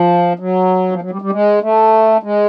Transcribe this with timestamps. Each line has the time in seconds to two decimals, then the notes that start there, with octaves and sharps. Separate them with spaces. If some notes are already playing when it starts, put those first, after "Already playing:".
Already playing: F3
0.39 F#3
0.91 F3
1.02 F#3
1.11 G3
1.22 G3
1.32 G#3
1.62 A3
2.23 G#3